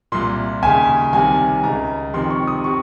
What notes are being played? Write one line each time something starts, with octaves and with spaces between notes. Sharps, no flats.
C2 A#2 C6
D#2 C#3 G#5
C2 C3 D#3 G#5
C#2 C#3 A#5
F2 C3 D#3 C6
C#6
D#6
C3 C#6